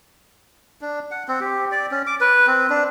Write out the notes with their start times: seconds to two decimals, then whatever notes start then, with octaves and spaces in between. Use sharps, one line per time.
0.81 D4
1.11 F#5
1.28 C4
1.41 G4
1.72 D5
1.91 C#4
2.07 D6
2.21 B4
2.47 C4
2.70 D4